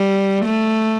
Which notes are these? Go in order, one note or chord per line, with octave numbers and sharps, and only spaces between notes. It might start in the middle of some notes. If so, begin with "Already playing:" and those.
Already playing: G3
A3